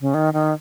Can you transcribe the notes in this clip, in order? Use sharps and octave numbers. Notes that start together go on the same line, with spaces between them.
C#3
D#3
D#3